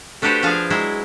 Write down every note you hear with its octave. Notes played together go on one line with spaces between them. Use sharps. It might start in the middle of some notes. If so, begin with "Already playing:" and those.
A3 D4 F#4 G4 B4 C5
F3 D4 G#4 F5 G#5
F#3 G#3 E4